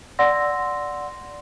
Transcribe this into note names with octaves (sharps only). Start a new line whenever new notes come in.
D5 F#5 C6 E6 A#6